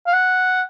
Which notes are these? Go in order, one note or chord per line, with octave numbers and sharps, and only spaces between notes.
F5
F#5